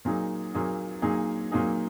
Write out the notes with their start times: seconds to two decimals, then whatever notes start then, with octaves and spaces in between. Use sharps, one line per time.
0.05 A#2 F#3 A#3 D#4 G#4
0.54 A#2 F#3 A#3 D#4 G#4
1.02 A#2 F#3 A#3 D#4 G#4
1.51 A#2 F#3 A#3 D#4 G#4